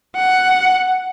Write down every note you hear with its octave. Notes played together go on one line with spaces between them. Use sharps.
F#5